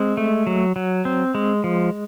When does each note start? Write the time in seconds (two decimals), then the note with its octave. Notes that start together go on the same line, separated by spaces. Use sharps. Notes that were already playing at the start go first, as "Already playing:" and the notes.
Already playing: G#3 C4
0.17 A3
0.47 F#3
0.76 F#3
1.05 C4
1.35 G#3
1.64 F3